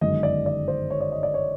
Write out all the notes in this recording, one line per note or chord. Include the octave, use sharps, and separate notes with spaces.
G1 F#2 D#3 G#3 D#5
D5
D5
C5
C#5
D5
D#5
D5
C#5